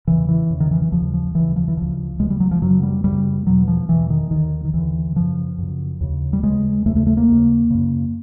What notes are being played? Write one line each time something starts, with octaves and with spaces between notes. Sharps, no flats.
E2 C#3 E3
E3
E2 C#3
D#3
E3
E3
D#2 C#3 F3
F3
D#2 C#3 E3
F3
E3
D2 C#3 F3
D2 C#3 G#3
G3
F#3
F3
F#2 C#3 F#3
G3
F#2 C#3 G3
E2 B2 F#3
F3
E2 B2 E3
D#3
D#2 D3 D#3
D#3
D#2 D3 E3
F#2 C#3 F3
F#2 C#3
D#2 C#3
G3
D#2 C#3 G#3
D#2 C#3 A3
A3
A3
A#3
D#2 C#3
F#2 C#3